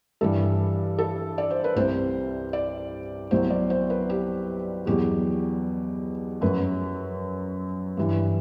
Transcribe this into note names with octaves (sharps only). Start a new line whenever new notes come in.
G2 E3 G3 A4
A4
D5
C5
B4
C2 C3 G3 C5
D5
C2 B2 F#3 C5
D5
C5
B4
G4
E2 B2 F#3 G4
F#2 F#3 B4
G2 E3 G3